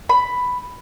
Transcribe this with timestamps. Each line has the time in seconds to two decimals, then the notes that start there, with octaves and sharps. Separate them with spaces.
0.09 B5